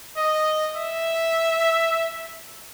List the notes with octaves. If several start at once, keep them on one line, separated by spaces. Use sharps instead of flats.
D#5
E5